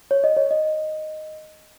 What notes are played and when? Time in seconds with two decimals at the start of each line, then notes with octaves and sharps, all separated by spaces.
0.11 C#5
0.24 D#5
0.37 C#5
0.51 D#5